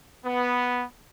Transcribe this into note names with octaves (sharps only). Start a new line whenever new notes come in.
B3